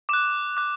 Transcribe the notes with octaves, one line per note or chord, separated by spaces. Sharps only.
D6 F#6 E7
D6 F#6